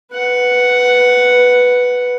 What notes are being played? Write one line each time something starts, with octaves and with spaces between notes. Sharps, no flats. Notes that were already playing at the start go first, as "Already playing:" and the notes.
B4 F#5